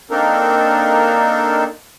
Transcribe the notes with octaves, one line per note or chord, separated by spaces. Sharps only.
A#3 C4 D4 D#4 A4 A#4